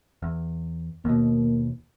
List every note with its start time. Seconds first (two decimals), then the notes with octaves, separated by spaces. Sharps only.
0.22 E2
1.05 D#2 B2 A#3